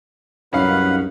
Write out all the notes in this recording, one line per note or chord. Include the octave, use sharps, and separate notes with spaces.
C2 F#2 C#4 D#4 B4 F5 F#5 B5